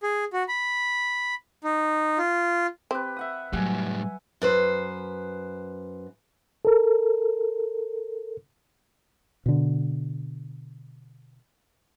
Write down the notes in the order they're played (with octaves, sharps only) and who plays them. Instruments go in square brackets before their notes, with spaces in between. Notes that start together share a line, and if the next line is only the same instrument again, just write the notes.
[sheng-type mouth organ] G#4
F#4
B5
D#4
F4
[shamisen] C4 [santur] G4 B4
[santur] E5 F#5 D#6
[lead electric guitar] A2 G3 [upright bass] F#3 [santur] F#5 G#5
[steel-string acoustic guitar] F#2 B4 C5
[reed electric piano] A4 A#4
[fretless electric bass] B2 D3